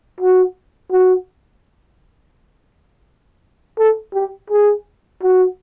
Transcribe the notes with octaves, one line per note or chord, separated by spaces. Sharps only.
F#4
F#4
A4
G4
G#4
F#4